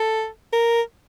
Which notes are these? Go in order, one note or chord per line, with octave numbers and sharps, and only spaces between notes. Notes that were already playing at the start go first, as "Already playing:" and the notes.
Already playing: A4
A#4